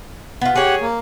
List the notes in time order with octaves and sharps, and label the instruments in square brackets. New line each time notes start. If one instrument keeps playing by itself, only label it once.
[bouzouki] B3 F4
[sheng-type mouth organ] G4 F#5 [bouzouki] G#4 C#5
[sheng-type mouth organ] A#3